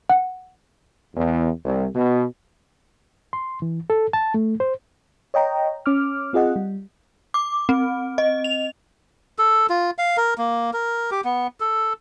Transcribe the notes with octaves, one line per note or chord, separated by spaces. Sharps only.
F#5
E2
C2
B2
C6
E3
A4
A5
A3
C5
C#5 D#5 G5 A#5
C#4 D6 F6
C4 F4 G#4 D#5 F#5
G3
D6
C4
D#5
F7
A4
F4
F5
A#4
A#3
A#4
G4
B3
A4